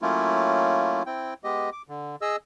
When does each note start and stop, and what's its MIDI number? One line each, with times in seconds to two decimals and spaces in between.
0.02 1.03 54
0.02 1.03 57
0.02 1.03 58
0.02 1.03 61
0.02 1.03 64
0.02 1.03 65
1.06 1.34 60
1.06 1.34 64
1.06 1.34 79
1.44 1.70 56
1.44 1.70 59
1.44 1.70 67
1.44 1.70 75
1.72 1.82 86
1.88 2.16 50
2.21 2.36 68
2.21 2.36 75
2.21 2.36 88